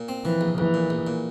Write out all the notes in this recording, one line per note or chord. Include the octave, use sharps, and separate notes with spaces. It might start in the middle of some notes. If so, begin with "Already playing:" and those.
Already playing: A#2
C4
E3 F3
A#1
A#1 E3
A#2
A#1
A#2